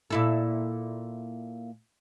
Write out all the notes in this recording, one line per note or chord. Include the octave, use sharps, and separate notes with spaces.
A#2 E4 A4